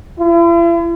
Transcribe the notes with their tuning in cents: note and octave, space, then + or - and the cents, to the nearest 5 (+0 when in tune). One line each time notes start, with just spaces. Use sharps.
E4 +45